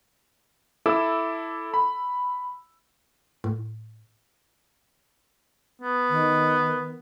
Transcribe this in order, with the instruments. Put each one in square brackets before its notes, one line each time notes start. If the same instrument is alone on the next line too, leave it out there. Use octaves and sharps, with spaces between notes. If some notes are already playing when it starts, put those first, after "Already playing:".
[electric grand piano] E4 A4 D6 E6
B5
[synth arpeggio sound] A2
[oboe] B3
[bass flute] D#3